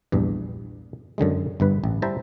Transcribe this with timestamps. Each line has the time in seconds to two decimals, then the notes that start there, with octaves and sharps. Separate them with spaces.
0.12 A#1 E2 G2
1.18 F#2 D3 D#3 G#3
1.60 G1 G2 B4
1.84 A1
2.02 G3 E4 C5 E5 A5 A#5